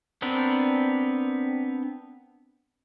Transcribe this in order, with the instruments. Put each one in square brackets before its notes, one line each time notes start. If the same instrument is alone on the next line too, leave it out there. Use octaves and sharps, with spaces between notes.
[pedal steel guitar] B3 C4 D4 A#4